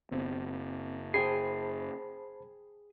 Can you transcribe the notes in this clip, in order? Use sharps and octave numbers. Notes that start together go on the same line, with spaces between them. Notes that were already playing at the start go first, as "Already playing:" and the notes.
F#1 F#2 B3 C4
G#4 C5 G5 A5 B5 C7